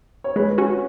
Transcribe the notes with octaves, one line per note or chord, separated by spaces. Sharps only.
C#5
G#3 B4
C#4 F#4